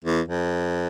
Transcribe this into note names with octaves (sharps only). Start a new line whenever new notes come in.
E2
F2